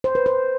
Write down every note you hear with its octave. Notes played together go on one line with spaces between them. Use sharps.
C5
B4
C5